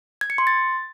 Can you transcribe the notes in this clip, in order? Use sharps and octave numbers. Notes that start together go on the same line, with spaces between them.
G#6
C#7
C6
A6